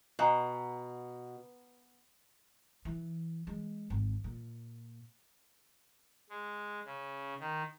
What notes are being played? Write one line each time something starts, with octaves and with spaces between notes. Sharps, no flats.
B2 F#5 G#5 A#5
E3
G#3
G#1
A#2
G#3
C#3
D#3